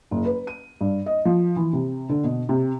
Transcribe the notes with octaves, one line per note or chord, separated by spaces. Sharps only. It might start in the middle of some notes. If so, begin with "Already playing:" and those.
F#1
B4
D#7
G2
D#5
F3
E3
C3
D3
B2
C3